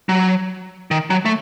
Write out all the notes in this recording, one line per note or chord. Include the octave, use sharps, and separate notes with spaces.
F#3
D#3
F#3
A3